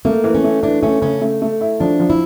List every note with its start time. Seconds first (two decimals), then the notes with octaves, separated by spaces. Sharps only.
0.05 A3 A#3
0.24 E3
0.35 C#4
0.44 A3
0.63 E3 D4
0.82 A3 C#4
1.02 C#3 C#4
1.21 A3
1.42 A3
1.61 E4
1.80 F3 D4
2.00 F3
2.10 E4